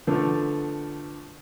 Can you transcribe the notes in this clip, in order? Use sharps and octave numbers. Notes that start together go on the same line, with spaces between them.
D3 F3 A3 B3